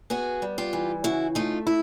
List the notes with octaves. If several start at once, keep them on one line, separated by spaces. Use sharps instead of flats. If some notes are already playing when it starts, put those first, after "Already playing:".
B3 F#4 G#4
G3
F4 G4
E3
C#3 E4 F#4
A3 D#4 F4
E4